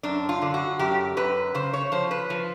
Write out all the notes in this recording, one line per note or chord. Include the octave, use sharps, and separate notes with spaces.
F#2 D4
F4
D3
F#4
F#2 G4
F#2 B4
C#3 C5
C#5
F3 C5
B4
F3